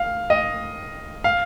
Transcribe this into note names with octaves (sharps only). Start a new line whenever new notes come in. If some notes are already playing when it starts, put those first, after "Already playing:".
Already playing: F5
D#5
F5